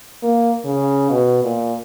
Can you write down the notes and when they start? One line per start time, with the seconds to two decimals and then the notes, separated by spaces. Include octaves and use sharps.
0.23 A#3
0.65 C#3
1.10 B2
1.43 A#2